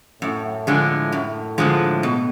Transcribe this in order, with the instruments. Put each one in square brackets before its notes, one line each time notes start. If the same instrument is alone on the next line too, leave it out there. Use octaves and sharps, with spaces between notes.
[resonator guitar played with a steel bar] F#2 [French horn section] A2
[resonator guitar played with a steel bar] D3 F3 G#3
F#2
D3 F3 G#3
B2